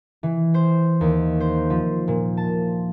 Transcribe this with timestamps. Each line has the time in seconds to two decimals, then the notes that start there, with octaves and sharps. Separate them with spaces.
0.23 E3
0.54 C5
1.01 D#2
1.40 C5
1.70 F3
2.08 A#2
2.37 A5